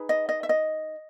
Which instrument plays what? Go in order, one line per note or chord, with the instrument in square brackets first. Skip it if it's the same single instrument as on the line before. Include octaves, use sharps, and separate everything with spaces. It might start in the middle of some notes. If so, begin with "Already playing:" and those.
Already playing: [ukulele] D#4 G#4 B4
D#5
D#5
E5
D#5